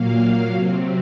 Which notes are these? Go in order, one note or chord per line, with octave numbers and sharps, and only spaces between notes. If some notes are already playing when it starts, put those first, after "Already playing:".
Already playing: A#2 F#3 A#3 F5
C3 F#3 C4